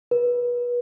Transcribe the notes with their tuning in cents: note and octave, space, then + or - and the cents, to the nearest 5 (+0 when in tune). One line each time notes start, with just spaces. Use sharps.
B4 -30